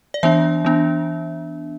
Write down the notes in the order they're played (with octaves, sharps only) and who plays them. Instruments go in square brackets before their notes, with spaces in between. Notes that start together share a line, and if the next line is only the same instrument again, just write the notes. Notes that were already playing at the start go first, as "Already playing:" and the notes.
[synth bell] D5
E3 B3 D4 E5
E3 B3 D4